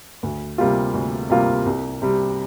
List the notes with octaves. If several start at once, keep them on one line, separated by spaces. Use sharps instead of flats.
D2
C3 G3 A#3 F4
D2
C3 G3 A#3 F4
C2
C3 G3